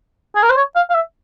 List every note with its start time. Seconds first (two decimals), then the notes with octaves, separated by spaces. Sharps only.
0.36 G#4
0.43 A#4
0.50 C5
0.56 C#5
0.75 F5
0.90 F5
0.95 E5